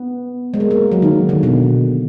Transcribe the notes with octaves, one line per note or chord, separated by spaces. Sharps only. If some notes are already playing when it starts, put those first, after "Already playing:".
Already playing: B3
G#3
A#3
A#3
F#3
D#3
D3
B2